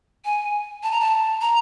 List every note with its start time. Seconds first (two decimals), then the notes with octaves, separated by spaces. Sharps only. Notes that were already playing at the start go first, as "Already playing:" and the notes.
0.25 G#5
0.83 A5
0.92 A#5
1.00 A5
1.41 A#5